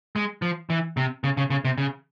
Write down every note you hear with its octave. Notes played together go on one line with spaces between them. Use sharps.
G#3
F3
E3
C3
C#3
C#3
C#3
C3
C#3